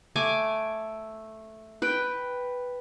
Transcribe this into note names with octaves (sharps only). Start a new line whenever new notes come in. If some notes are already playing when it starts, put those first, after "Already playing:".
A3 G#5 D6
B4 G5